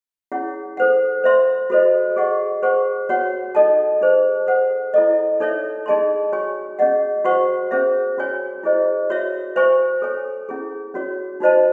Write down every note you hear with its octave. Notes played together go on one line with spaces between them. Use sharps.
C#4 E4 G#4 C#5 F#5
A4 C5 F#5
C5 E5 C6
F#4 A4 C5 D#5
G#4 D#5 F#5 C#6
G#4 C5 F#5 C#6
F#4 C#5 F#5
D#4 A4 D#5 A5
D#4 G#4 C5 D#5
A4 C5 F#5
E4 A4 D#5
D#4 A4 C#5 E5
D#4 G#4 D#5 A5 C6
F#4 C#5 G#5 C#6
C#4 G#4 D#5 F#5
F#4 C5 F#5 C#6
C#4 G#4 C5 E5
C#4 F#4 C#5 G#5
E4 G#4 C5 D#5
F#4 C#5 E5
C5 E5 G#5 C#6
A4 C#5 G#5
C#4 E4 G#4
C#4 F#4 C#5
D#4 F#4 C5 D#5 A5